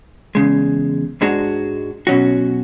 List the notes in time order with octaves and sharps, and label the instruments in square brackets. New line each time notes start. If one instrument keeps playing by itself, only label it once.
[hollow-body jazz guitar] E2 C#3 G#3
G#2 G#3 D4 F#4
B2 F#3 C#4 F#4